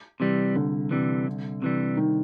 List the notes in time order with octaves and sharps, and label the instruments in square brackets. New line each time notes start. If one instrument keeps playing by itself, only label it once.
[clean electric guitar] C3 E3 G3
[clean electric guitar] C2 [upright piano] D3
[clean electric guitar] C3 E3 G3
C2
C3 E3 G3
[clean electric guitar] C2 [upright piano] D#3